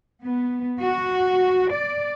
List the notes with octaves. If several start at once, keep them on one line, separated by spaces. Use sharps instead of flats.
B3
F#4
D5